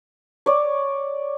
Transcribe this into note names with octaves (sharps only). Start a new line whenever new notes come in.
C#5 D5